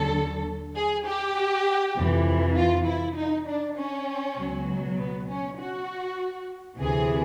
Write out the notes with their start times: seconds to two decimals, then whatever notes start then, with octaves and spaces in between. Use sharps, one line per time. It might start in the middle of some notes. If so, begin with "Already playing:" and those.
Already playing: D#2 D3 F#3 A4
0.75 G#4
1.06 G4
1.95 F2 C3 E3
2.56 F4
2.87 E4
3.16 D#4
3.47 D4
3.77 C#4
4.37 C#2 B2 F#3
4.98 B3
5.28 C#4
5.58 F#4
6.79 D2 C3 E3 G#4